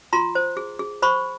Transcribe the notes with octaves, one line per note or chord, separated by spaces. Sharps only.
F4 A#5 C6
C5
G#4
G#4
C5 B5 C#6